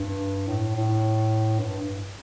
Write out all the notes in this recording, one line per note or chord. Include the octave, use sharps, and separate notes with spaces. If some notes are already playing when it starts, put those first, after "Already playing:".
Already playing: G2
A2
A2
G2